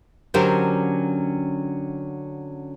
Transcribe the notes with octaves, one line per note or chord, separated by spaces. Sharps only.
D3 F#3 C#4 G4 A#4 C5